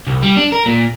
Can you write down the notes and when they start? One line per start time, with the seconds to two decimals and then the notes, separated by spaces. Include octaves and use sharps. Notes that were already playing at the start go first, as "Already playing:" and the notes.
0.07 C2
0.22 G3
0.37 D4
0.53 A#4
0.66 A#2